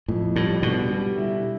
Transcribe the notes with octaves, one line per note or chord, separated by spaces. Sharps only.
F2 A2
A2 G3
B2 D3
G3
E4